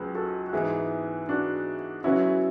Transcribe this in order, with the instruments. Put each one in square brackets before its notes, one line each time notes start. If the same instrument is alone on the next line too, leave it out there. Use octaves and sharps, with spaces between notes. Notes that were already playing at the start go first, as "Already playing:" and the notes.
Already playing: [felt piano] C#2 F#3 [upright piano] G#4 B4
[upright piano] F#4 A4
F#4
[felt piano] G#2 E3 B3 [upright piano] E4 G#4
[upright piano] D4 F#4
[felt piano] C#3 F#3 B3 F#4 [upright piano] C#4 E4